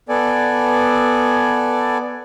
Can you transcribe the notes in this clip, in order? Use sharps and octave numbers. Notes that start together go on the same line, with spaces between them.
B3 A4 D5 G#5